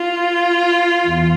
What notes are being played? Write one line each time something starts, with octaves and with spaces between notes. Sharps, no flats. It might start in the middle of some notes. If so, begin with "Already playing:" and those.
Already playing: F4
E2